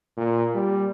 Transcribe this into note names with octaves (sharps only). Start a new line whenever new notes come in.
A#2
G3